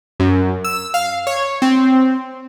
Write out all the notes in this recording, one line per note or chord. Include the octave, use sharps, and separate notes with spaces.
F#2
E6
F5
C#5
C4